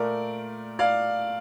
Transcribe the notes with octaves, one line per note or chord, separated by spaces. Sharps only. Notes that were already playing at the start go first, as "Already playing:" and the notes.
Already playing: A#2 A3 A#4 D5
D5 F5